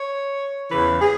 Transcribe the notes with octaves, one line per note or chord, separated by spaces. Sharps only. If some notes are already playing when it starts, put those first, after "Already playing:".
Already playing: C#5
E2 C#3 E3 B4
G#4